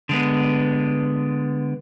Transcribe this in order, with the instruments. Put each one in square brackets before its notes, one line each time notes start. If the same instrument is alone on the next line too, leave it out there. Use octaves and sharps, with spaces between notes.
[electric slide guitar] D3 G#3 B3